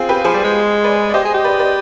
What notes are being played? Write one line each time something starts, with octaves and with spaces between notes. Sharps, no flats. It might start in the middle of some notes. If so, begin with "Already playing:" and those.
Already playing: C4 F4 G#4
G4 B4
F3 G#4 C5
G3
G#3
B4 D5
D5
G4 C5 D#5
G#4
G4
B4 D5
B4 D5